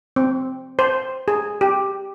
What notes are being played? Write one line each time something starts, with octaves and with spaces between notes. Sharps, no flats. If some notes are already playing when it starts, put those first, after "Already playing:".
C4
C5
G#4
G4